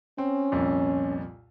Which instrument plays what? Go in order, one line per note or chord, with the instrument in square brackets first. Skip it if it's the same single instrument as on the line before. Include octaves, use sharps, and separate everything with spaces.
[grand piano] C4 [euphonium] C#4
[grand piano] C2 F2 A#2